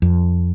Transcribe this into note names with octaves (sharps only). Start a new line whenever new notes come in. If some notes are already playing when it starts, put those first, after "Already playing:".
F2